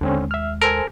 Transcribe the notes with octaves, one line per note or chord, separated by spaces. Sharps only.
D#2 D3 G#3 C4 C#4
E5 F6
A4 A#4 C5 G#5